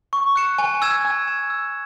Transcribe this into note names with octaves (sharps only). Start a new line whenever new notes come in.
C#6
F#6 C#7 E7
G#5
E6 G#6 E7
G#5
E6 G#6 E7
E6